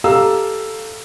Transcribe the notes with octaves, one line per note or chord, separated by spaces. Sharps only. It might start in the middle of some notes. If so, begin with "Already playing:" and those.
G4 A4 F5 A#5 E6